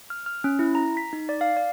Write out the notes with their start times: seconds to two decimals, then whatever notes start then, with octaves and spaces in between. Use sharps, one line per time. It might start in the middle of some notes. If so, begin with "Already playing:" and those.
0.10 F6
0.26 F6
0.44 C#4
0.59 E4
0.75 A#5
0.97 B6
1.13 D#4
1.29 D5
1.41 F5
1.57 D5